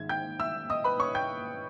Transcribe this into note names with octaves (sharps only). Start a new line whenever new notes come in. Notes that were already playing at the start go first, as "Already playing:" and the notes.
Already playing: G#2 D#3 G#3 E5 G#6
G5 G6
E5 E6
D#5 D#6
B4 B5
C#5 C#6
G5 G6